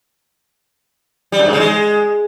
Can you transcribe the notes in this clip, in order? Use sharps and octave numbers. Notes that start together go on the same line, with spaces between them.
G3
F#2
G#2
C#3
G#3